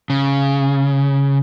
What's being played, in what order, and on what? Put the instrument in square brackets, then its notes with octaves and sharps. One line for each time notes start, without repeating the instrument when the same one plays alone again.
[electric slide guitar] C#3